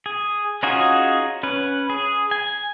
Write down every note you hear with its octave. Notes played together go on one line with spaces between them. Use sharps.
G#4
C#4 D#4 F4 F#4 G#4
C#4 B4
G#4
G#5